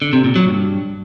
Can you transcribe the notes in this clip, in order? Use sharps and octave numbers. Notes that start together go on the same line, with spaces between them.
D3
C3
A#2
F#3
G2